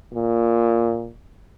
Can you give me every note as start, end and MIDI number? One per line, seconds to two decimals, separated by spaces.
0.13 1.10 46